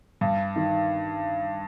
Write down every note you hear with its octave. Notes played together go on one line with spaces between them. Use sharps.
G2
D#3